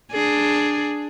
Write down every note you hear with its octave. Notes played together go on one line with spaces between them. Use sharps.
D4 G#4